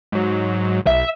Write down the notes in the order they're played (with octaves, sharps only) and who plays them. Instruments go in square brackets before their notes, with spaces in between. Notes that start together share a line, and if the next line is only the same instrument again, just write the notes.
[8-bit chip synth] G#2 F#3
[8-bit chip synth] B1 [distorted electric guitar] E5